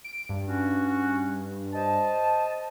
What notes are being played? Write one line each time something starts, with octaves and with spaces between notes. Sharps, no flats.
D7
G2
C#4 F#4
C5 D#5 A5